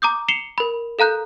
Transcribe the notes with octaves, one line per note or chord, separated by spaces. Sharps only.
A#5 D6 D#6 G6
C7 C#7 E7 F7 G7
A#4 B5
A4 F5 A#5 F#6 G6